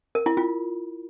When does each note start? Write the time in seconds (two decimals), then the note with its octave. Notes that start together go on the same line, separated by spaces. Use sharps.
0.15 A#4
0.26 E4
0.37 F4